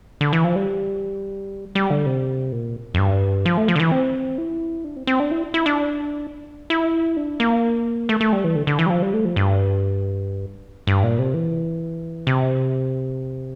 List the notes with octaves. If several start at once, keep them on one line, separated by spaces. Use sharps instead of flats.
D3
E3
F3
G3
G3
D3
C3
A#2
F2
G2
F3
A3
F3
D3
E3
C4
E4
D4
C4
C4
D4
E4
E4
D4
E4
D4
A#3
A3
A3
G3
E3
D3
D3
E3
G3
F3
G3
A3
F3
G2
G2
A#2
C3
E3
C3